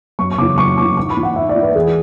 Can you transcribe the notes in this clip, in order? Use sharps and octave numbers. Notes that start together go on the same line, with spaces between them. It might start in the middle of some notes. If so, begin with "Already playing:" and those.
F#2 C#6
C#6
C#3 E3 D6
F#2 C#6
C#3 E3 D6
G#2 C#6
B5
E3
F#5
G#2 E5
D5
E3
B4
E2 G#4